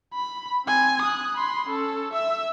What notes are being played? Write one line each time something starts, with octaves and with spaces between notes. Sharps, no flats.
B5
C4 G#5
D#6 F#6
B5 C6
C#4 A4
E5 E6